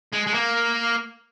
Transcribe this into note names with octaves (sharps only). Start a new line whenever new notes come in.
G#3
G#3
A#3